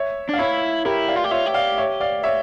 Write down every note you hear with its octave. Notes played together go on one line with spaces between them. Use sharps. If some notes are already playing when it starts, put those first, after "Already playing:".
Already playing: C#5 E5
D4 F5
E4 C#5 E5
E4 G4 A#4
D5 F5
F4
G4
F4 C#5 E5
G4
D5 F5
C#5 E5
D5 F5
C#5 E5